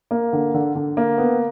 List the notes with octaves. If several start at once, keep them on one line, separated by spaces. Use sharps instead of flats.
A#3
D3
D3
D3
A#3
B3